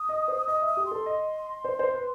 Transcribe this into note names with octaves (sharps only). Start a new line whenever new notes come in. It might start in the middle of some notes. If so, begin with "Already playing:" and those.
Already playing: D#6
D#5
C5
D#5 D#6
E5 D#6
G4
C6
A4
D#5
C5
C5
B4